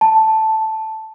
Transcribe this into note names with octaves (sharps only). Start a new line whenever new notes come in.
A5